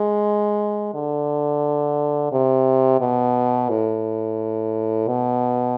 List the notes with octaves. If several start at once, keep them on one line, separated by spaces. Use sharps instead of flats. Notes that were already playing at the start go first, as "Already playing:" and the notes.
Already playing: G#3
D3
C3
B2
A2
B2